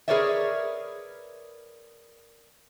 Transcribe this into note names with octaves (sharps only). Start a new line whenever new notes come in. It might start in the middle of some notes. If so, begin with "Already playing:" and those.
G#4 A#4 B4 C#5 D5 E5